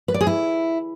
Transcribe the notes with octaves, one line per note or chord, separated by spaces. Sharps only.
B4
D5
G#4
E4